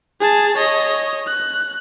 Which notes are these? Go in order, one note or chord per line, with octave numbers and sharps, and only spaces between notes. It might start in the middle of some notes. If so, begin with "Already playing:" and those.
G#4 A5
C#5 D#5
F#6